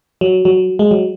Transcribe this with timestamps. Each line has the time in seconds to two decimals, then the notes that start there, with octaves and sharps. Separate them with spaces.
0.21 F#3
0.45 F#3
0.79 G#3
0.91 F#3